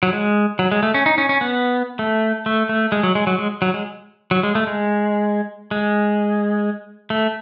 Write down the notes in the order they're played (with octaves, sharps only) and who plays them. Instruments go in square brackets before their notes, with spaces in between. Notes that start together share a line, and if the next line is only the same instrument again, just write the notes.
[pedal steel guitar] F#3
G#3
F#3
G#3
A3
C#4
D#4
C#4
C#4
B3
A3
A3
A3
G#3
F#3
G#3
F#3
G#3
F#3
G#3
F#3
G#3
A3
G#3
G#3
A3